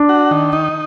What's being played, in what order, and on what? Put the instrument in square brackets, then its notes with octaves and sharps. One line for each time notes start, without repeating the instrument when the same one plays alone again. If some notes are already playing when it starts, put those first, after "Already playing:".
Already playing: [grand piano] D4
[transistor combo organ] F#4
D#3
D#4